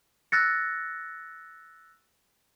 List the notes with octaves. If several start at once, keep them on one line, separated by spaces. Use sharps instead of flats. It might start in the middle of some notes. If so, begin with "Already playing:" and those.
E6 F#6 A6 A#6 C#7